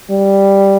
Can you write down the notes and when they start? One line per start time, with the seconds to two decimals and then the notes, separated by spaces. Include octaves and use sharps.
0.11 G3